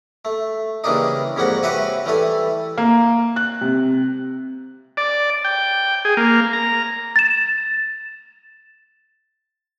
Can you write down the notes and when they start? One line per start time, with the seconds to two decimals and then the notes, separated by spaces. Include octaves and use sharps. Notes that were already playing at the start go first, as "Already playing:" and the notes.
0.25 A3
0.84 C#3 E3 G3 A#3 D4 D#4
1.36 F2 G#2 G3 A#3 F#4 F#5
1.63 F#4 G4 B4 C#5 E5 G#5
2.06 E3 G3 A3 A4 G#5
2.78 A#3
3.36 F#6
3.61 C3
4.97 D5
5.45 G5
6.05 G#4
6.17 A#3
6.53 A#5
7.16 A6 E7